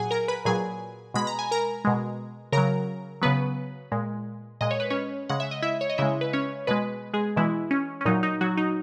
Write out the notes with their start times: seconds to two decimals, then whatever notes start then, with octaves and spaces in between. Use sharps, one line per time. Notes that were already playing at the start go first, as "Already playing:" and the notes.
Already playing: A#2 F#3 G#4 F#5 G#5
0.11 A#4 A#5
0.28 B4 B5
0.45 A#2 F#3 G#4 G#5
1.14 B2 G#3 B5
1.27 A#5
1.39 G#5
1.51 A#4 A#5
1.85 B2 G#3
2.52 C#3 F#3 A#4 A#5
3.22 C#3 F#3 B3 B4
3.92 A#2 G#3
4.61 A#2 G#3 D#5
4.71 C#5
4.80 B4
4.90 C#4 C#5
5.29 C#3 G#3 F#5
5.40 E5
5.51 D#5
5.62 E4 E5
5.81 C#5
5.90 D#5
5.98 C#3 G#3 E4 E5
6.21 B4
6.33 C#4 C#5
6.67 B2 G#3 B3 B4
7.14 G#3 G#4
7.36 B2 E3 G#3 E4
7.71 C#4
8.01 C#4
8.05 A#2 F#3 D#4
8.23 D#4
8.41 F#3 F#4
8.58 D#4